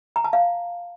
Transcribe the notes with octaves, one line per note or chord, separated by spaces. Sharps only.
A#5
A5
F5